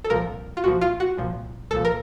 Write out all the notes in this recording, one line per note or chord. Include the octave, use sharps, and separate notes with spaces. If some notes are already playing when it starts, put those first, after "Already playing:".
A4
C2 A#2 F3 A#4
F4
C2 A#2 F3 F#4
F4
F#4
C2 A#2 F3
C2 A#2 F3 A4
A#4